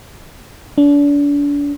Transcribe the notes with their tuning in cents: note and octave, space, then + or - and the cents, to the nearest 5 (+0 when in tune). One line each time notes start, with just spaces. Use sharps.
D4 -35